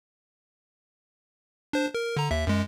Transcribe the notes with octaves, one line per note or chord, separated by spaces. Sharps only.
D4 C5
A#4
D3 A#5
D#2 E5
F#2 G#3